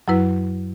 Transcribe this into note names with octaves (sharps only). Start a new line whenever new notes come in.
F#2 F#3 E4 B4